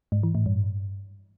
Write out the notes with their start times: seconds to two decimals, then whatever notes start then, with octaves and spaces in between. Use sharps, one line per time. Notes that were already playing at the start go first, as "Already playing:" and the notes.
0.12 G#2
0.23 E3
0.35 A2
0.46 G2